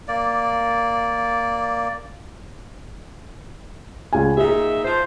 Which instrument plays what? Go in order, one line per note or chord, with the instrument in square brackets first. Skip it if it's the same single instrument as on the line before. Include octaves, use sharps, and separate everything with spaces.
[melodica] A#3 D5
[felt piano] C#2 G#5
[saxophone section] A#2 D#4 E5 [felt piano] G#4
[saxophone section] F3 F4 C5